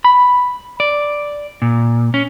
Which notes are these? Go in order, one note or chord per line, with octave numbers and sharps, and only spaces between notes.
B5
D5
A#2
C#4